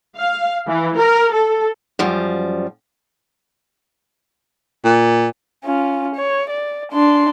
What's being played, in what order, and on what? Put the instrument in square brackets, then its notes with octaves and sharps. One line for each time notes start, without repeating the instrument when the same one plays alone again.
[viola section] F5
E3
A#4
A4
[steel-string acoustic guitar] F#2 F3 G3
[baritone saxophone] A#2
[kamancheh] C#4 F4
C#5
D5
D4 C6